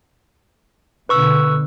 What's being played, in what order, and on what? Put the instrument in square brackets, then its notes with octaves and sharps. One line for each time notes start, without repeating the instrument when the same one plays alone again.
[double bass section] B2 D3 [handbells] B4 C#6 E6